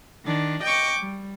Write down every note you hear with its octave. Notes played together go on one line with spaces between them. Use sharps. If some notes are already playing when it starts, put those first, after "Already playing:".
D#3 D4
D#5 G5 C#6 D6
G3